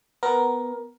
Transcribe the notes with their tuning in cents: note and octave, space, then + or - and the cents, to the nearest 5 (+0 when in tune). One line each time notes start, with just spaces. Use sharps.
B3 +5 A#4 +15